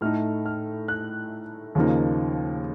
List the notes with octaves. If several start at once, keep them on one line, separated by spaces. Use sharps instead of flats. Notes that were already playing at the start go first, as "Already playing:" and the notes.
A2 A3 D#4 F6
F6
F#6
D#2 C#3 F3 A#3 D#4